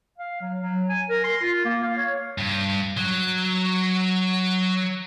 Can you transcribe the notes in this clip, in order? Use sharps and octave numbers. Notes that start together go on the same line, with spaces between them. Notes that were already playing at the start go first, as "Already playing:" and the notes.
F5
F#3
F#3
G#5
A#4
C6
F4
A#3
F5
C#5
G2
F#3